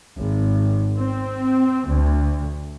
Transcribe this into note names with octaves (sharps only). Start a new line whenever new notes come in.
G#1
C4
D2